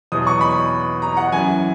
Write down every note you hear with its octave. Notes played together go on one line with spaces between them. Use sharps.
E2 B2 F#3 D#6
C#6
B5
A#5
F#5
F#2 E3 G#5